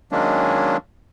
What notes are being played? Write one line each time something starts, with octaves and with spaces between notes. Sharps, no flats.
D#3 F#3 G#3 A#3 C#4 D4